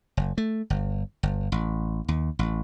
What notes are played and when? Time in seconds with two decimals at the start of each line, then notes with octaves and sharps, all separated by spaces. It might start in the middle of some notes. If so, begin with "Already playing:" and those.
0.17 F#1
0.38 A3
0.70 G1
1.23 G1
1.52 A1
2.08 D#2
2.39 A1